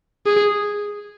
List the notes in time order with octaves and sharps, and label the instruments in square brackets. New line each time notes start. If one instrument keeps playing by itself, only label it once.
[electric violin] G#4